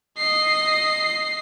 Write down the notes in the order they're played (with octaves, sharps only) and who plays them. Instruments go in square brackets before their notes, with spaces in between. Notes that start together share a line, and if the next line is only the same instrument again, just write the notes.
[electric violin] D#5 C7